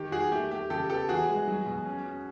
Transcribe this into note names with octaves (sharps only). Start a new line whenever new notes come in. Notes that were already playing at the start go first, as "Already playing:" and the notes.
Already playing: D#3 G4
D#3 F#4 G#4
A3 G4
A3 G4
C#3 G4 A4
B3 G4 A4
E3 F#4 G#4
G#3
F#3
B2
C#4
C#4